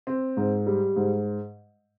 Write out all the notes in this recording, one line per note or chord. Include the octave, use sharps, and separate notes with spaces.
C4
G#2
G3
G#2